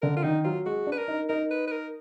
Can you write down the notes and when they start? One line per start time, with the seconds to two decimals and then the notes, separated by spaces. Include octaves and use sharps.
0.02 D3 A#4
0.17 F4
0.24 D#3 D#4
0.44 F#3 F4
0.66 G#3 F#4
0.87 D4 B4
0.98 A#4
1.08 D#4
1.29 D#4 A#4
1.50 B4
1.67 B4
1.72 A#4